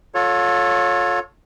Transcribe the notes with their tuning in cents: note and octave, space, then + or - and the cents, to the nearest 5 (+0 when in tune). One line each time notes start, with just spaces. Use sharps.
F4 +35 A4 +0 C#5 +0